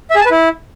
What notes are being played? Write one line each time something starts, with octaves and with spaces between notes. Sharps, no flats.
E5
G#4
A5
B4
E4